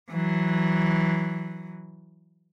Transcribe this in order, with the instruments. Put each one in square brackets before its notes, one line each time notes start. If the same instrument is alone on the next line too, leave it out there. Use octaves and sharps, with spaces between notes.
[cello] E3 F#3